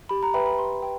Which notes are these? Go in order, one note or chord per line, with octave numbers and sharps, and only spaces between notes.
G4 B5
A#5
B4 E5 G5 B5
B5
G4 C6
B4 G5